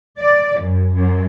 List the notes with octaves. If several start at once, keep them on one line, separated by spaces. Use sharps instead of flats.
D5
F#2
F#2